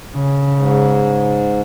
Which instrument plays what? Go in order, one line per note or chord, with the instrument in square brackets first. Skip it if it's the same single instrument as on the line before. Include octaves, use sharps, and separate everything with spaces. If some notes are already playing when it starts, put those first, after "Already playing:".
[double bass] C#3
[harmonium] G#2